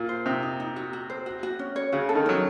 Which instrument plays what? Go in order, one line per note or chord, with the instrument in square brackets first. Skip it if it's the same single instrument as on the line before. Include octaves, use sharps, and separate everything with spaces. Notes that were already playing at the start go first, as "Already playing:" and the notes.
Already playing: [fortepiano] A#2
[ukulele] C5
[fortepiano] C3 [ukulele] D#4
[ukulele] D#4
D#4
F#4
F#4
C5
F#4
F#4
C#4
C#5
[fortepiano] C#3 [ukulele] F#4
[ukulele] A4
[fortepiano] D#3
[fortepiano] F#3 [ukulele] C#4